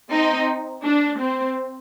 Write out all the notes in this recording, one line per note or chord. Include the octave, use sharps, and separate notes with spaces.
C4 D#4
D4
C4